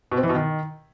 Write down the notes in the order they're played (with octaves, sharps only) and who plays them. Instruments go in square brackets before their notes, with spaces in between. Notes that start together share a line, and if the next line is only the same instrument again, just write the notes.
[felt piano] B2
C4
E3
B2
D#3